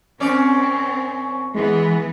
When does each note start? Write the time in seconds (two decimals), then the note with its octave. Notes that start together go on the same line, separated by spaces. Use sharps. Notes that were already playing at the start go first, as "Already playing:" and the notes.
0.20 F#2 C4 C#4 D5
1.55 E3 G#3 B3